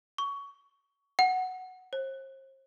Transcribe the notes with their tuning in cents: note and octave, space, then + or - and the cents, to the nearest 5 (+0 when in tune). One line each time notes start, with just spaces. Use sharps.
C#6 +20
F#5 +0
C5 +40